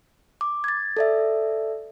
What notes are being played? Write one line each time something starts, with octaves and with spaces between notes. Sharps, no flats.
D6
G#6 A6
A4 D5 E5